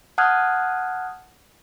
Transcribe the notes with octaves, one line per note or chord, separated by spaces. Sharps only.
F#5 A5 D#6 F6 F#6 G#6